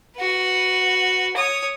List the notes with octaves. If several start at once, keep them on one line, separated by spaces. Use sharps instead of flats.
F#4 B4
C#5 D#6